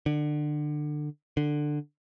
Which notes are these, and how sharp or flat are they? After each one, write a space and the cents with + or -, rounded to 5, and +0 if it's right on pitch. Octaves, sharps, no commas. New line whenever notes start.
D3 +25
D3 +15